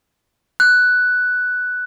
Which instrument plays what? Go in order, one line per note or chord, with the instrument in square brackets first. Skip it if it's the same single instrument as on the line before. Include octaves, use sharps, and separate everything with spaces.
[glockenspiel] F#6